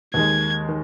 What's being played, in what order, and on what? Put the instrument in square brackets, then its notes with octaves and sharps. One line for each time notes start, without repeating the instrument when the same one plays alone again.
[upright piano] D#2 D#3 G#3 [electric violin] G#6
[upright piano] D#3